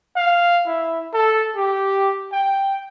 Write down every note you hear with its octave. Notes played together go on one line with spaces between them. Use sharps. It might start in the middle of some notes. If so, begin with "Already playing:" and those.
F5
E4
A4
G4
G5